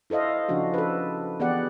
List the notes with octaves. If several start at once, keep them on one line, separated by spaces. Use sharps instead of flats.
E4 A4 C5 D#5 F5
C#3 F3 C#4 D4 F#4
A4 B4
E3 B3 G4 G#4 D5 F#5